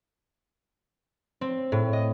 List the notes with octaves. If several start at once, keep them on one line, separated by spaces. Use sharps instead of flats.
C4
A2
D#5